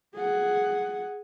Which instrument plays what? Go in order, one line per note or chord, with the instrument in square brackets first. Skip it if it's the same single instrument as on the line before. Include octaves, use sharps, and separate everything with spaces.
[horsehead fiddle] G#4 F#5